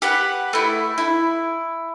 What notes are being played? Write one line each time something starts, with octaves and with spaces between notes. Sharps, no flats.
G4 B4 F#5
A3 E4
E4